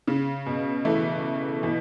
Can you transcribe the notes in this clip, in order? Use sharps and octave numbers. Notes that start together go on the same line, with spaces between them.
C#3
B2
E3 A3
B2 E3